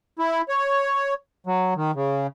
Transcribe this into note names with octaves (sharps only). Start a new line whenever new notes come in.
E4
C#5
F#3
D#3
C#3